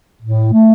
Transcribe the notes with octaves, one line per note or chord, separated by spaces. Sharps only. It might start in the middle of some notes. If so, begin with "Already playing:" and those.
A2
A3